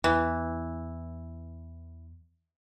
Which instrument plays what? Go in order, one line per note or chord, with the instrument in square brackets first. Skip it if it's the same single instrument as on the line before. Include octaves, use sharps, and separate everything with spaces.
[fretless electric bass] E2 [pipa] E3